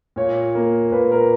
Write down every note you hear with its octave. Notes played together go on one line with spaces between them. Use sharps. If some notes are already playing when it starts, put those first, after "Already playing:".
A#2 C#5
A#3
A#2 B4
A#4